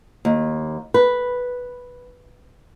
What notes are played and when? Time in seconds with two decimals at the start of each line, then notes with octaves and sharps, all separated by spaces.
0.25 D#2
0.94 B4